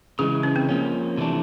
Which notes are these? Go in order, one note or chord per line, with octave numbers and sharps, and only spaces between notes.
C#3 E3 G#3 G#4
C#4
C4
F3 A#3 C#4
C3 E3 A3 D4